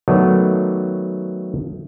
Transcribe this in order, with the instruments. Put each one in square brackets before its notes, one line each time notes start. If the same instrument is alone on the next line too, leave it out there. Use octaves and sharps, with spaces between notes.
[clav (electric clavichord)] D#3 F#3 A3 B3 C#5 D5